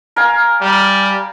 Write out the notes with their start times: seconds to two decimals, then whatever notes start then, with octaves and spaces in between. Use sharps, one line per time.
0.16 A#4 F5 G#5
0.61 G3